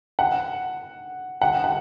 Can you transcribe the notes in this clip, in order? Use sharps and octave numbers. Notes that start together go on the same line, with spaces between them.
F#5
F#5
F#5